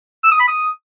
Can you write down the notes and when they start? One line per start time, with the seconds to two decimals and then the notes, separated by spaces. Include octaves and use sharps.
0.24 E6
0.32 D#6
0.40 B5
0.48 D#6